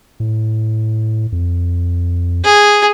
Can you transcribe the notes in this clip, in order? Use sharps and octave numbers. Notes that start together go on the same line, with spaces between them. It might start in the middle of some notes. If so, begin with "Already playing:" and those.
A2
F2
G#4